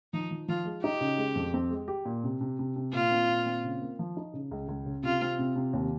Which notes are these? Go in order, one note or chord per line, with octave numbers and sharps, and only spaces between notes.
F3 D#4
F3
F3 F4
G#3
D#4 G4
C#3
G#3
F2
C4
G#3
G4
A#2
C3
C3
C3
C3
A#2 F4
C4
A#2
C4
C#3
A#3
F3
D#4
C#3
C#2
C#2
C#3
C3 F4
C4
C3
C3
D#2